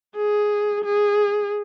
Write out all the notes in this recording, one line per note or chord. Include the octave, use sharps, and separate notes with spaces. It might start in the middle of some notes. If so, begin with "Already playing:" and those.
G#4
G#4